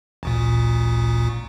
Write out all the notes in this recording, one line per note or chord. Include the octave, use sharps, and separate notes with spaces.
A1 D2 A#2